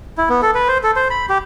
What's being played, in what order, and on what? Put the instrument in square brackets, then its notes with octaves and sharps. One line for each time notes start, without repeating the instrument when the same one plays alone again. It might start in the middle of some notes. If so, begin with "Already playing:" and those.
[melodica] E4
B3
A4
B4
C5
A4
C5
B5
G4